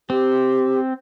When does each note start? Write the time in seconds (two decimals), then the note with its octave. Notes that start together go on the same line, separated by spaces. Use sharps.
0.10 C4 G4